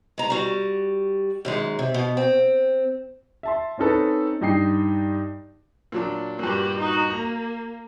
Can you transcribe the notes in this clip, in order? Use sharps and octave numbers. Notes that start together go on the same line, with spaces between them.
G#3 A#5
G3 F#4
F#2 D#3 G#3
C3
B2
C4
E5 A5 C6
C4 C#4 D#4 A4 B4
G2 D#4 G5 C7
A#2 F#3 D4
G2 A#2 F#4 G4
D#4 F#4
A#3 A#5